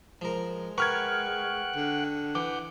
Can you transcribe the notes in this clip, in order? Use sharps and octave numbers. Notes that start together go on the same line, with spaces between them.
F3 G#3 A#4
A#4 B4 F#5 G5 C#6 F6 F#6 G#6
D3
E3 F#5 D6 G6